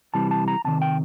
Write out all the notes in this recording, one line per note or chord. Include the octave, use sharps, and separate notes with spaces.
C3 E3 G3 A5
A5
A#5
E2 C3 D#3 A5
G5